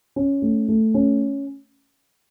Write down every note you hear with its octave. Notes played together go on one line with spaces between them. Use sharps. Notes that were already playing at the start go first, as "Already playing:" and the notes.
C#4
A3
A3
C#4